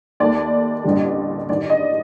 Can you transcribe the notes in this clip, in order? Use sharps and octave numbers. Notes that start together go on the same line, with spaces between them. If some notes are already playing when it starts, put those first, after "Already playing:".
D#2 D#3 A3 D5
A1 G2 D3 G3
A1 G2 D#3 D5
D#5